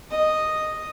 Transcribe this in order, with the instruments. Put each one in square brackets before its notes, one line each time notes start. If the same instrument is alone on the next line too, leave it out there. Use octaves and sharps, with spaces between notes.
[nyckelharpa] D#5